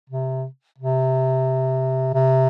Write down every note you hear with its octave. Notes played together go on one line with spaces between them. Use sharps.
C3
C3
C3